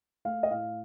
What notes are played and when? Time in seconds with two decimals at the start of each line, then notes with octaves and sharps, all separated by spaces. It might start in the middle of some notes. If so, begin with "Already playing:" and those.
0.25 A3 F5
0.43 D#5
0.51 A2 F5